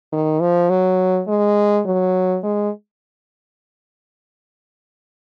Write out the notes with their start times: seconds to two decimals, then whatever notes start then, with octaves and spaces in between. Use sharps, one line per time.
0.12 D#3
0.41 F3
0.70 F#3
1.28 G#3
1.86 F#3
2.43 G#3